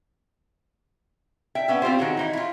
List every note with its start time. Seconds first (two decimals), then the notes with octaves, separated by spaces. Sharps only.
1.55 E5 G5
1.68 B3 C#4 E5
1.82 C4 F4 G4 C5
1.99 D#3 F#4 G#4 C#5
2.17 E3 D#4 E4
2.33 E4 F4